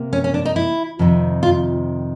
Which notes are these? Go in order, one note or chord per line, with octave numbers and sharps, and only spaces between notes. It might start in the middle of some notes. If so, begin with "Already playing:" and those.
Already playing: C3 A#3
C#4
C#4
D4
D#4
E4
F2 C3 D#3
F4